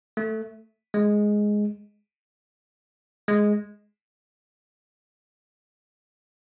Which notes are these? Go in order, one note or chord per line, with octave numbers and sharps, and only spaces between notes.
A3
G#3
G#3